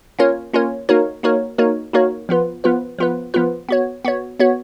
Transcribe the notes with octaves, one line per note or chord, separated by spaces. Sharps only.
A#3 C#4 F4 A#4 C#5
A#3 C#4 F4 A#4 C#5
A#3 D#4 F#4 A#4 C#5
A#3 D#4 F#4 A#4 C#5
A#3 D#4 F#4 A#4 C#5
A#3 D#4 F#4 A#4 C#5
F3 B3 F4 B4
F3 B3 F4 B4
F3 B3 F4 B4
F3 B3 F4 B4
B3 F#4 C#5
B3 F#4 C#5
B3 F#4 C#5